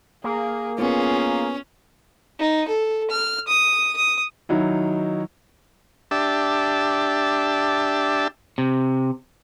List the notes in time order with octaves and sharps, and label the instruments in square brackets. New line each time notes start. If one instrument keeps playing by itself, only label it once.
[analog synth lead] A#3 [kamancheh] G#4
[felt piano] B3 [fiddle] C#4 [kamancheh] F4 G#4
[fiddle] D#4
A4
F6
D#6
D#6
[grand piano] D#3 F#3 D#4 E4
[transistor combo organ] D4 G4 E5 A5
[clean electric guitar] C3